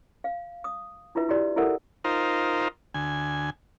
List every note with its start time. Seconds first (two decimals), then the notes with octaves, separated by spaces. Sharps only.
0.24 F5
0.64 D#6
1.15 D4 E4 F4 B4 E5
1.29 E4 F#4 G4 D5
1.56 E4 G4 A4 A#4 E5 F#5
2.04 D#4 F4 A#4 C5
2.94 D2 G#5